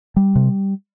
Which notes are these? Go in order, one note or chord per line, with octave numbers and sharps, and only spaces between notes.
G3
C3